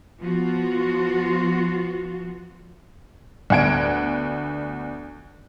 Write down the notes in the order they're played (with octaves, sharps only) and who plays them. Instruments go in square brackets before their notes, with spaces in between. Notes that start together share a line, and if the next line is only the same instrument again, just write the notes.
[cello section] F3 B3 F4 F#4
[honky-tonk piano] D2 B3 F#5 G#6 D7